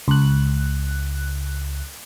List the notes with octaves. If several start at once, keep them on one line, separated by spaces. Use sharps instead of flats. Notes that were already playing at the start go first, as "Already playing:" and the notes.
C#2 F#6